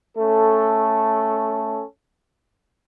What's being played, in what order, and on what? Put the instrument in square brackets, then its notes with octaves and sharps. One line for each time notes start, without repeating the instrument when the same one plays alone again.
[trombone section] A3 C#4 A4